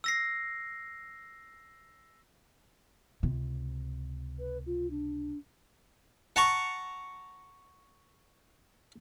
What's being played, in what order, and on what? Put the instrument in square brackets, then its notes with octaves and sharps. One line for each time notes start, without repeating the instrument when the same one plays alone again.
[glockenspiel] E6 A#6 C7
[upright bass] C#2 C3
[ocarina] B4
F4
D4
[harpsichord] F#5 A5 A#5 C#6